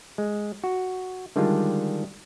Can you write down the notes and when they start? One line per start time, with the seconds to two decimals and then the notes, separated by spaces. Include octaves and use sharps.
0.18 G#3
0.64 F#4
1.36 D3 D#3 G3 G#3 D4 F4